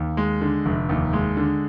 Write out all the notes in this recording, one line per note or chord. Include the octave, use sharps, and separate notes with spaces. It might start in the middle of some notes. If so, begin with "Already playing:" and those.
Already playing: D#2
G#3
D3
F1
D#2
G#3
D3